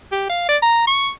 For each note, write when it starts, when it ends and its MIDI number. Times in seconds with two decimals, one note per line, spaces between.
0.12 0.26 67
0.30 0.46 77
0.49 0.57 74
0.62 0.82 82
0.87 1.10 85